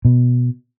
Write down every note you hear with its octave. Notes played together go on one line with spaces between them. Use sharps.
B2